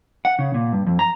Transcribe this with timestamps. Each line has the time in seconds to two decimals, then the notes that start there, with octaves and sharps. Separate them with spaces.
0.25 F#5
0.39 C#3
0.54 A#2
0.72 G2
0.86 F2
0.99 A#5